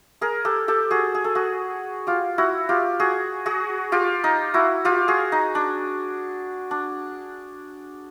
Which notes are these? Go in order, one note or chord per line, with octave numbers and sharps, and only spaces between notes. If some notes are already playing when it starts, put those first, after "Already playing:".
G#4 A#4
G4 A4
G4 A4
F#4 G#4
G#4
A4
F#4 G#4
F4 G4
E4 F#4
F4 G4
F#4 G#4
F#4 G#4
F4 G4
D#4
E4 F#4
F4 G4
F#4 G#4
D#4
D4
D4